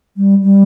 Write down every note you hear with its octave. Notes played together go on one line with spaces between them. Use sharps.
G3
G3